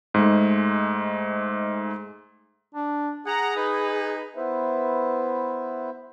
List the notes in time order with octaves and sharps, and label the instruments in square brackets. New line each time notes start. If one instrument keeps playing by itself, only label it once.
[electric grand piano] G#2 G#3 A3
[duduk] D4
[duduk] G#4 [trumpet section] F#5 A#5
[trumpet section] D#4 B4
[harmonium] B3 E4 B4 C5 E5